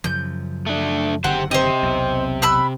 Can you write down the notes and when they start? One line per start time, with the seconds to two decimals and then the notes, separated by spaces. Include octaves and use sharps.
0.04 F#2 C#3 F3 G6
0.66 A3 D4
1.24 F#1 D3 D#3 G4 C5 F#5
1.51 C3 G4 C5 D#5
1.83 B1 E2
2.42 B5 E6 F#6